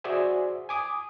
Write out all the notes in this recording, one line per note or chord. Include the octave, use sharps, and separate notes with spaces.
F#4 G#4 C5 D5 E5 G#5
G#5 D6 D#6